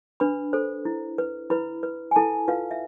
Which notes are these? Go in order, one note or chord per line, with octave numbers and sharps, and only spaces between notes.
D4 B4 B5
A4 C5
E4
B4
E4 B4 B5
B4
G#5
E4 A4 A5
F4 B4 F5
E5